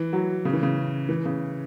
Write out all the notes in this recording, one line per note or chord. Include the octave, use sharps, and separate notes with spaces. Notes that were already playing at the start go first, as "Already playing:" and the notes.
Already playing: E3
F#3
C#3
E3
C#3
E3
C#3